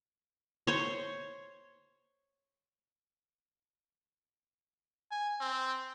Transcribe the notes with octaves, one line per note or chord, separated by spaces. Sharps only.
C5 C#5
G#5
C4